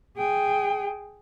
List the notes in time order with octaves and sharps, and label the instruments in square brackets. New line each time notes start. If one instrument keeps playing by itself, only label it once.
[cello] G#4 G5